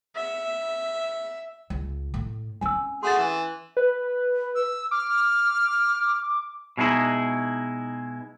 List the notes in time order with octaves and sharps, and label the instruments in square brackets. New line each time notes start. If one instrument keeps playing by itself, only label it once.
[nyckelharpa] E5
[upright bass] C#2
A2
[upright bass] C4 C#4 [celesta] G#5 E6
[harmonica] A3 F#4 G#4 [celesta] C6 A6
[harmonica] E3
[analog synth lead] B4
[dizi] E6
[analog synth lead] D6 [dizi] F6
[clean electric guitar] B2 G#3 D#4 E4